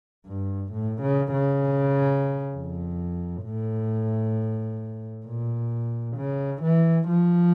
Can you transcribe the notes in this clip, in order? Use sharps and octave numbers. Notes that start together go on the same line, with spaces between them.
G2
A2
C#3
C#3
F2
A2
A#2
C#3
E3
F3